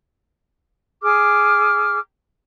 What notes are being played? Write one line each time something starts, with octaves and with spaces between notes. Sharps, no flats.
G#4 D6 F6